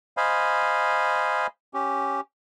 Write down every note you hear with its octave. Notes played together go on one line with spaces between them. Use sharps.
C5 D#5 F5 G#5 B5
C#4 G4